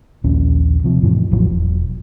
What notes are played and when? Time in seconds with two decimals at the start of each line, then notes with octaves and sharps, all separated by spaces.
0.24 D#1 A#1 D#2 C#4
0.84 C3 F3
1.02 F2 A2 E3
1.31 A1 A2 F3 F#3
1.45 E1